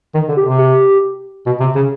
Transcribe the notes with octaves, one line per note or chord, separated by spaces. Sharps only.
D#3
D3
G4
C3
G4
B2
C3
C#3